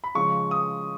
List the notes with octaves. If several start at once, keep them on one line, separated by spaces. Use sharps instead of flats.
B5
C#3 F3 G#3 C#6
D#6